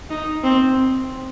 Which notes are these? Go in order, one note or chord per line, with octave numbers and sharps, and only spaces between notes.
D#4
C4